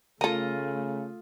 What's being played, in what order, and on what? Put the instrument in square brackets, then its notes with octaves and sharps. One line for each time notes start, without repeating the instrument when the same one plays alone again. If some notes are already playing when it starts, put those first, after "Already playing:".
[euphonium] C#3 [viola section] A3 [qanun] F4 D#5 [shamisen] A4 A#4